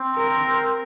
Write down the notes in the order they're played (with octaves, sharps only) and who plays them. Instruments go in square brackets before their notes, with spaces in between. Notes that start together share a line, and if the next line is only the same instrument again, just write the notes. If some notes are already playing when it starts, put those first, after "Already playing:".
Already playing: [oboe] C4
[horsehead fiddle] A#4